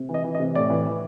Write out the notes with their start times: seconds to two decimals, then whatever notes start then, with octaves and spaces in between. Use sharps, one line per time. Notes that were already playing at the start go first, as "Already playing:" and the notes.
Already playing: C3
0.09 E3
0.14 D#5
0.24 E3
0.35 D#5
0.40 C3
0.55 A2 D5
0.70 E3
0.86 E3